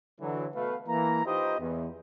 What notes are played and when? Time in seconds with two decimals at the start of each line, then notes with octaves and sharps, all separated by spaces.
0.21 D3 E3 F#3
0.55 B2 A3 B4 F5
0.88 E3 A#3 A#5
1.25 D#4 F4 G4 B4 C5 D#5
1.60 E2